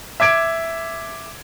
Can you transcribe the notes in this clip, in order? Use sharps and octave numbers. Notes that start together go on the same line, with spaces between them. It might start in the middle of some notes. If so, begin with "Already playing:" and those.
E5 D6 G#6 D7